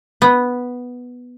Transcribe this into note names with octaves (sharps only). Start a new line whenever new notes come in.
B3